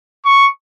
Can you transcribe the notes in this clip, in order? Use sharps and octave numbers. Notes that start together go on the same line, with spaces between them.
C#6